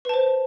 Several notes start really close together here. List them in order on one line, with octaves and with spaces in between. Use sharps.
B4 A5 C5